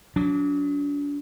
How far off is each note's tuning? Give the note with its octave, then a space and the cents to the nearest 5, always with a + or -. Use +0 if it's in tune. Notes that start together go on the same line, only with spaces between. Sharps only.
F#3 -30 D4 -35